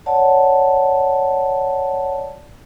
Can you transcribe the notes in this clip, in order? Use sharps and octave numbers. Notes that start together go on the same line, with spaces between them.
C#5 D5 F#5 A5